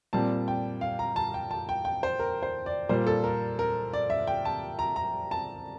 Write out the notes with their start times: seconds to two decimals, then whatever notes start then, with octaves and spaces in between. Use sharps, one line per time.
0.13 A#2 G3 C4 A5
0.48 G5
0.81 F5
0.99 A#5
1.16 A5
1.34 G5
1.51 A5
1.69 G5
1.85 G5
2.03 C5
2.19 A#4
2.43 C5
2.66 D5
2.89 A#2 G3 A#3 C5
3.07 A4
3.24 A#4
3.59 A#4
3.93 D5
4.10 E5
4.27 G5
4.45 A5
4.79 A#5
4.96 A#5
5.31 A5